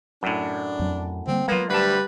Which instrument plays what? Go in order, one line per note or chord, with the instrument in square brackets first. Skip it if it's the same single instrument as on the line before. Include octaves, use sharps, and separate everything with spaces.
[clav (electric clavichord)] F#2 A2 [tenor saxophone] D4
[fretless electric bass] F2 F#3
[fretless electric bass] D3 G3 A#3 [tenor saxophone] C4
[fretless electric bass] F#3 G#3 [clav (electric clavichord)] A#3 F4 [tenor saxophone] B3
[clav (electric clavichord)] D2 A5 [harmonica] G3 [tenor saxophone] B4